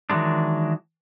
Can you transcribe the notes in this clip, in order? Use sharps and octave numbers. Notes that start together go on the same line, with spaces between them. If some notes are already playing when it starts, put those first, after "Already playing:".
D#3 E3 F#3 G#3 D4